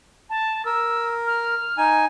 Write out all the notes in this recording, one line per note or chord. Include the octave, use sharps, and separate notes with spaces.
A5
A#4 E6
F6
D#4 G#5